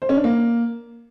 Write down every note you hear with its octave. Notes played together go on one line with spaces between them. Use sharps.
C5
C#4
D4
A#3